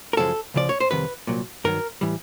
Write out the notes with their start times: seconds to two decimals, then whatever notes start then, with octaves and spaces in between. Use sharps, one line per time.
0.13 A#4
0.17 F#2 C#3 F3 G#3 A4
0.54 C#2 C#3 F3 D5
0.69 C#5
0.80 C5
0.91 F2 C3 D#3 G3 B4
1.27 C2 A#2 F#3
1.64 G2 D#3 F#3 A#4
2.01 A2 E3 G3